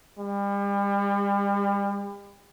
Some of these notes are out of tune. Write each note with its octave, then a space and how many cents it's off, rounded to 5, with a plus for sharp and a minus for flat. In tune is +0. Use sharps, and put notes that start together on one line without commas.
G3 +40